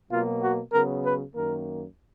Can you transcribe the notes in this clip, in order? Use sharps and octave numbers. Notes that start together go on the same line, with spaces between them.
B2 F#3 A#3 F4
F#4
C#3 F#3 B3 A#4
B4
F#2 D#3 A#3 A#4